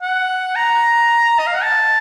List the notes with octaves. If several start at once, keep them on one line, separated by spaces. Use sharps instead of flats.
F#5
A#5
D#5
F5
F#5
A5